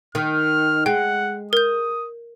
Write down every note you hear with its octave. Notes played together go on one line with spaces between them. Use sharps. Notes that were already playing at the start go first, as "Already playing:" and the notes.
D#3 F6
G#3 F#5 G5
A#4 D#6 G6